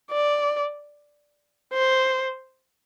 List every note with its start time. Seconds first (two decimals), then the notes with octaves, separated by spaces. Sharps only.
0.11 D5
1.73 C5